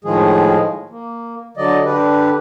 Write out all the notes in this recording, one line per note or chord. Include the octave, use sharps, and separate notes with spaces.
A2 D#3 F3 G#3 G#4
A#3
D3 F#3 D5 D#5
D3 D4 G4 B4